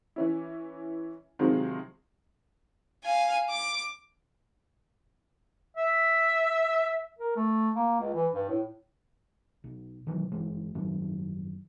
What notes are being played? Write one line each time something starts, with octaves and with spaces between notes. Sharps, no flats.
E3 C#4 E4
C3 D#3 F3 F#3 G#3 C4
F5 G#5
D6
E5
A#4
A3
A#3
C#2
E3
G2
A2
B1
B2 D#3 E3 F#3
G1 E3 G#3
F#1 G#2 D#3 F#3